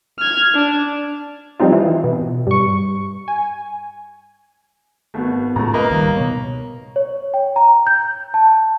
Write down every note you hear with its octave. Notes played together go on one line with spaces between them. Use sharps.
F6 G#6
D4
F3 G3 C4 D#4 F4
E3
B2
G2 C#6
G#5
G#1 A3 B3 F#4
C#2 A2 A3 A#5
A#3 A#4 B4 D#5 A#5
C#2 D#3 G3
B2 B3 C#5
C#5
G5
A#5
G6
A5